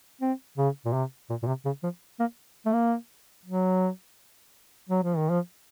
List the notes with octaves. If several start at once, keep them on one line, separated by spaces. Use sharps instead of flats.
C4
C#3
A#2
C3
A#2
A#2
C3
C#3
F3
A#3
A3
A#3
F#3
F#3
F3
D#3
F3